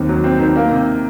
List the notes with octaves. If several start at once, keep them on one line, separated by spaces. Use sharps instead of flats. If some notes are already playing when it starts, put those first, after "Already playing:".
Already playing: D#2 D#3 C4
F#3
C4
D#3
A#3
C3